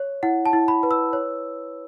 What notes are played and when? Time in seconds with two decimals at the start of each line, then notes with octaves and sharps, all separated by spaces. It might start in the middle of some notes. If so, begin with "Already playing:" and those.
Already playing: C#5
0.23 E4 F#5
0.46 A5
0.53 E4
0.68 B5
0.83 B4
0.91 E6
1.13 C#5